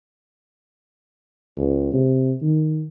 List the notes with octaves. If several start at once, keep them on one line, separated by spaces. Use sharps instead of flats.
C#2
C3
D#3